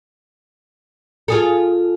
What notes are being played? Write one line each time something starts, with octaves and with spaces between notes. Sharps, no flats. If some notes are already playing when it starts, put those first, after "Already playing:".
F4 G#4 A4